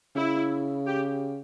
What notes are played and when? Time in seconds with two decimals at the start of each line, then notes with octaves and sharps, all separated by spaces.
0.16 C#3 E4
0.87 G4